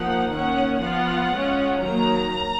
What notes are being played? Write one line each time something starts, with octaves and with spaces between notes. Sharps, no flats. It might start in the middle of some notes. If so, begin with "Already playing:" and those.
Already playing: F3 A#3 D#4 F#5
D#3 A#3 C#4 F#5
F3 B3 F4 F#5
G#3 C#4 F4
D#3 F#3 A#3 A#5